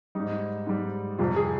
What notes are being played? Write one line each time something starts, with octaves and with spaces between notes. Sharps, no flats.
G#2 G3 D#4
G#2 G3
F2 C3 G3 F4
G#4